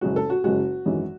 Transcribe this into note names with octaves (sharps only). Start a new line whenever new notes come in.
F#1 F#2 C#3 G#3 F#4
A4
F#4
F#1 F#2 C#3 G#3 F#4
G#1 F#2 E3 G#3